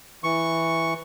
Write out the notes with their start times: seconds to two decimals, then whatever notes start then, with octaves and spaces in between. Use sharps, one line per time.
0.24 E3 C#6